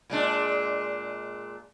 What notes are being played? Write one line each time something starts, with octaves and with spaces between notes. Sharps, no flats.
A#2 G#3 D4